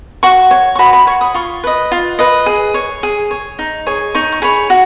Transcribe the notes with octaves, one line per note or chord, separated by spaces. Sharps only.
F#4 C#6
C#5
C#6
F#4 B5
B5
C#5 C#6
D#6
F4 C#6
B4 D#5
F4
B4 D#5
G#4
C#5
G#4
C#5
D#4
G#4 C#5
D#4 C#6
C#6
G#4 C#5 B5
F#4